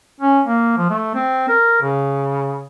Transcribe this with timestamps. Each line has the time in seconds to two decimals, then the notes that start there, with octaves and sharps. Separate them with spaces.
0.20 C#4
0.46 A#3
0.77 F3
0.90 A3
1.15 C4
1.49 A#4
1.82 C#3